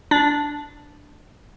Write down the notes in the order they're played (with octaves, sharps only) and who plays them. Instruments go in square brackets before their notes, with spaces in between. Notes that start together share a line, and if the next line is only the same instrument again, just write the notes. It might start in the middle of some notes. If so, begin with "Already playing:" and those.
[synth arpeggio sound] D4